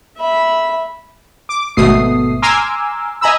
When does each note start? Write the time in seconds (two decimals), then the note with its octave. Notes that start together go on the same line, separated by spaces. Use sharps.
0.17 E5 B5
1.49 D6
1.77 G#1 B2 A3 D#6 C7
2.42 G#5 A#5 C6 D6 E6 F6
3.21 D#5 G#5 A#5 B5 E6